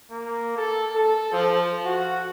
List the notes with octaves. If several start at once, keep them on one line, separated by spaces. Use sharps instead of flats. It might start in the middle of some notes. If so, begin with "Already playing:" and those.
A#3
A4
A4
F3
F#4